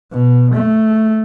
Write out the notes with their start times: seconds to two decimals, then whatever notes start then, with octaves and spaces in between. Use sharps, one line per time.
0.13 B2
0.55 A3